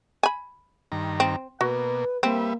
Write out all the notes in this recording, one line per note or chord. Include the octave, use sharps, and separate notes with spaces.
G#5 B5
G2 D#3 A#5
C4
B2 A#3 F#4 B4
G3 A#3 C4 B4 E5